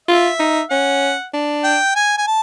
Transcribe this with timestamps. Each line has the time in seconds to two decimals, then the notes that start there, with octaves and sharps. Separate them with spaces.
0.08 F4 E5
0.39 D#4
0.70 C#4 F#5
1.34 D4
1.64 G5
1.95 G#5
2.18 G#5
2.27 A5